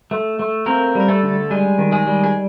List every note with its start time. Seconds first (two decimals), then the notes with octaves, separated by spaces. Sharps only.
0.11 A3
0.39 A3
0.66 A#3 C4 A#4
0.95 G3 A#4
1.08 A3 A4
1.23 D3
1.50 G3 G#3 G#4
1.78 D#3
1.92 G#3 G#4
2.06 G3
2.24 G#4